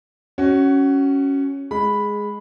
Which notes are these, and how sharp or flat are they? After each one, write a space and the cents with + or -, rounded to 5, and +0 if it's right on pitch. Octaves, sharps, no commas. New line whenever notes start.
C#4 +0 F#4 +20
G#3 +0 B5 +0